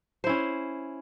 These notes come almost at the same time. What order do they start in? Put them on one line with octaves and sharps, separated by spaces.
C5 E4 C#4